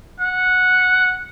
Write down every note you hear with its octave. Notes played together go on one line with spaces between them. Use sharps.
F#5